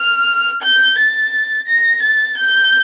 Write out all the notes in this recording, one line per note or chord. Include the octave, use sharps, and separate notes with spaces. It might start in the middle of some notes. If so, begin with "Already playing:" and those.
Already playing: F6
G6
A6
A#6
A6
G6